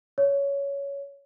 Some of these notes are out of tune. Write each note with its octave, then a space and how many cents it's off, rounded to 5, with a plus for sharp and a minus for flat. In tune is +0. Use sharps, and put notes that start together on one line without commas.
C#5 +15